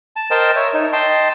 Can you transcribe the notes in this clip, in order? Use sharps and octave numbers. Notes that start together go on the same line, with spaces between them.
A5
A#4 C5 D#5 G5 A5
C#5 E5
D#4
D#5 G5 A5 C6